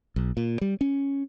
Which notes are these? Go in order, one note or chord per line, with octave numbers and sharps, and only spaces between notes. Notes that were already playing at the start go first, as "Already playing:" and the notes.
B1
A#2
G3
C#4